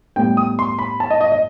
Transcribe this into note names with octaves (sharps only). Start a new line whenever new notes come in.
A2 G3 B3 G5
D#6
C6
B5
A5
D#5
D#5
D#5